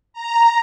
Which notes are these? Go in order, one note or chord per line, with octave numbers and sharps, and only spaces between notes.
A#5